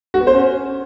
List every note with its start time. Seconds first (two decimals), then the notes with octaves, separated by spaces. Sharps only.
0.14 F#4
0.20 B3
0.27 C5
0.33 C#4